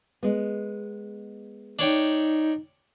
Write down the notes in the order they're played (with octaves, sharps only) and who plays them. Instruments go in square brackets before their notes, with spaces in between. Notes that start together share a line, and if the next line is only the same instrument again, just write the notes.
[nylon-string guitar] G#3 B3
[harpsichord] D4 C#5 G5 [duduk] D#4